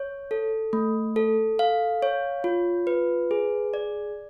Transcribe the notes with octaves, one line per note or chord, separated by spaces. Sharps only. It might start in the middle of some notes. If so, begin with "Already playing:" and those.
Already playing: C#5
A4
A3
A4
F5
C#5
F4
B4
G#4
D5